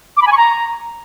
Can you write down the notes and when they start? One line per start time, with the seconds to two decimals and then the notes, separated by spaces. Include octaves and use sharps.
0.17 D6
0.22 B5
0.27 G#5
0.32 C#6
0.37 A#5